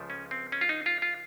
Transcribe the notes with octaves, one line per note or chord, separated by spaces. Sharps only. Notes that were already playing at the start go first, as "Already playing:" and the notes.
Already playing: C#2 C#3 F3 A3
C#4
C4
C#4
F4
D#4
F4
F4